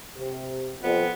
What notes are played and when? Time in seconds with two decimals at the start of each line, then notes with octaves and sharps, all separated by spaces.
0.18 C3
0.83 F2 B3